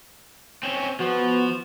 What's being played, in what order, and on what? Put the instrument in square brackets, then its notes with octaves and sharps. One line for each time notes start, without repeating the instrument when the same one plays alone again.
[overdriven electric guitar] C4 C#4
[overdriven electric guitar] F3 [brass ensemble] B3 [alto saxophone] F#4